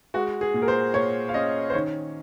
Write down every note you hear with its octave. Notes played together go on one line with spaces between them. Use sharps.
G#3 F#4
G#4
A#2
A#4
C5
A#2 C#5
F5
C#4 D#5
C5
D#3 C#5